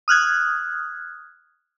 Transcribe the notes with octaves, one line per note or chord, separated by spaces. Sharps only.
D#6 F6 F#6 G#6